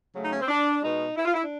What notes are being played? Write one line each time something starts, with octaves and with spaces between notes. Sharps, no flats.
C#3 F#3 A3
D#4
C#4
C4
D4
B2 G#3 D#4
E4
F4
E4
D4